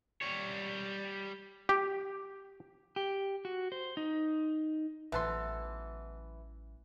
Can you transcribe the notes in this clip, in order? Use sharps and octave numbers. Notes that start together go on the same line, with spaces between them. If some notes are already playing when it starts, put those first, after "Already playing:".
G3 C#5
G4
G4
F#4
C5
D#4
A1 B2 E3 F#3 A4 E5 C6 F#6